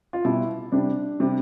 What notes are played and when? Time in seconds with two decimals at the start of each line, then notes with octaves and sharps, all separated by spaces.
0.13 F4
0.25 B2 G3 E4
0.72 C3 G3 D4
1.20 C3 G3